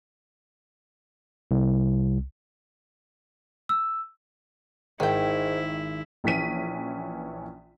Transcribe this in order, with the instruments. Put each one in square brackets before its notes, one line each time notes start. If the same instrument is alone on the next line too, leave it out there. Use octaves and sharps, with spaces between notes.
[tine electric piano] C2
[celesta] E6
[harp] G#1 [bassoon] G#2 [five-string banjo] D#3 G5 [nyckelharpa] E4
[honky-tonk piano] A#1 E3 C#4 B6 D#7